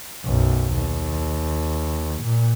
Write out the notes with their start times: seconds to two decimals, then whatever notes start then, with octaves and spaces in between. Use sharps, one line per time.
0.24 B1 F#2
0.73 D#2
2.22 A#2